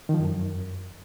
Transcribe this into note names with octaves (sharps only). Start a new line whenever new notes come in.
D#3
F3
F#2